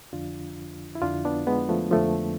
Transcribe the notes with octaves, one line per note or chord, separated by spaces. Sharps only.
F2 D3 F3 D4 F4
E4
F2 D3 F3 D4 F4
B3 D4
G#3 B3
F3 A3
F2 D3 F3 A3